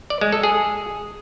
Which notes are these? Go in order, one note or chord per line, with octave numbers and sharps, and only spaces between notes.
D5
G#3
A4
G#4